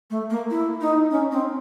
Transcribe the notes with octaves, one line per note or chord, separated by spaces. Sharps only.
A3
A#3
E4
D#4
C#4
C4